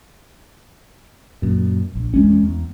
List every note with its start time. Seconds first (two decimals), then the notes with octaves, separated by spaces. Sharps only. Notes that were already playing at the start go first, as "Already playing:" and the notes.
1.42 F#2 A#2
1.95 A#1
2.14 E2 G#3 C#4
2.43 E2